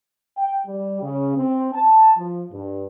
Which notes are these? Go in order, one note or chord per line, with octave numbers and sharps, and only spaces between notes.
G5
G3
C#3
C4
A5
F3
G2